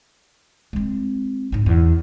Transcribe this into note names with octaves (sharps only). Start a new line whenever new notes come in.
G#3 C4
G#2 C4
E2